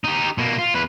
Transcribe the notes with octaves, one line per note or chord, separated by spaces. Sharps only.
D#4 G4
B2 A#3
F4
E2 B4